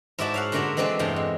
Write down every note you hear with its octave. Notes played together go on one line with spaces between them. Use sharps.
G#2 E4 F#4 D5 E5 A5
C#5 F5 F#5
A#2 D3 D4 F#4 E5 A#5
E3 G#3 C4 D4 A4 B4
E2 G2 C3 A3 G5
G#3